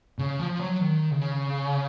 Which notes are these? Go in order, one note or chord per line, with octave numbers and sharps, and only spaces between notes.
C#3
F3
F#3
D#3
C#3